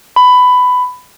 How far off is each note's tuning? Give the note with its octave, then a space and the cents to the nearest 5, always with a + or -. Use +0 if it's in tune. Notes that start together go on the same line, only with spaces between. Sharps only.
B5 +15